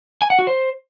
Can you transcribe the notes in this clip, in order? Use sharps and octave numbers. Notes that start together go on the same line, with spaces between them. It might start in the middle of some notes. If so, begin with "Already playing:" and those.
G#5
F#5
F#4
C5